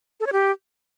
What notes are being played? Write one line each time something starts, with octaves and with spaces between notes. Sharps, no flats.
A4
C#5
G4